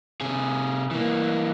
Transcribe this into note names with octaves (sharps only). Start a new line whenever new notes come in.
C3 G#4
E3 A#3